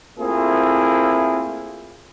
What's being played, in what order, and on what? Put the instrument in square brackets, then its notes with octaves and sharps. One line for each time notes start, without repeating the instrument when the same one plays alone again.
[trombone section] A3 A#3 C4 E4 F4 G#4